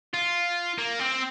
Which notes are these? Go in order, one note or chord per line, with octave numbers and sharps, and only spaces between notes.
F4
A#3
C4